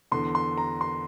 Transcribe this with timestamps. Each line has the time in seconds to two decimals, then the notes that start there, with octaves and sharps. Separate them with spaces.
0.12 E2 D3 C6
0.35 C6
0.57 A#5
0.81 C6